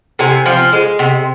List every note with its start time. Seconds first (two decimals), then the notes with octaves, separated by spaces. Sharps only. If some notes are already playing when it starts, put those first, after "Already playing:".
0.19 C3 G#5
0.46 F3
0.73 G#3
0.99 C3